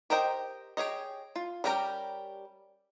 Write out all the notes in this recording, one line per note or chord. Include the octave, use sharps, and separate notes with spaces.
G4 A#4 C5 D#5 G5
G4 G#4 C#5 D#5
F4
G3 C#4 G4 A#4 A#5